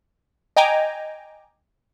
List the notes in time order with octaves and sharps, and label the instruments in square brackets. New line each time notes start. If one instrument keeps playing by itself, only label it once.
[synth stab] D#5 G5 G#5 A#5 D6